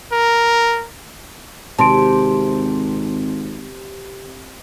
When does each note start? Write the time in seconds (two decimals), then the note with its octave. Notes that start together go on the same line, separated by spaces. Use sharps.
0.12 A#4
1.79 G#1 C3 A5 C6 D7